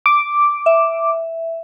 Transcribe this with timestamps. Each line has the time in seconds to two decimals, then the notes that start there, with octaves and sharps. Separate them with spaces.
0.06 D6
0.66 E5